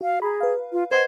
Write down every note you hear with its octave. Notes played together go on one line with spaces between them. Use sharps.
F#4 F5
G#4 A#5 B5
B4 F5
F4
B4 C5 D#5 F#5 G#6